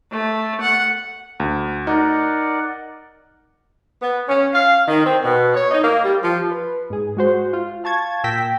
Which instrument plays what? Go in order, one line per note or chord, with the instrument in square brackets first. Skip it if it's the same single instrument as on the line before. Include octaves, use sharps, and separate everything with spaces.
[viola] A3
F#5
[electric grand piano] D2
[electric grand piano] D#4 [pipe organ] A#4 D5 F#5
[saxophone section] B3
C#4
F5
D#3
C4
B2
C#5
D#4
A#3
G3
F3
[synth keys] B4
G#2 G#4
G#3 F#4 C5
F4
F5 A5 C#6 G#6 A6
A#2 G5 E6 A#6 B6